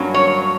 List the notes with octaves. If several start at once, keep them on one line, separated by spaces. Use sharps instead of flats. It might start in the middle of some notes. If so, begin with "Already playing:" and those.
Already playing: G2 F#3 A#3 C#4
C#5